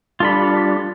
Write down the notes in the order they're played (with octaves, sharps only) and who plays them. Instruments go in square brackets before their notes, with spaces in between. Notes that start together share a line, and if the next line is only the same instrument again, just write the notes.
[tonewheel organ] G3 D4 [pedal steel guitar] F4 A4 B5